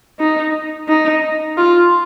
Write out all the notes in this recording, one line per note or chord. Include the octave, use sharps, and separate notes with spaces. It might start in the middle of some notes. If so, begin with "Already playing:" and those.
D#4
D#4
F4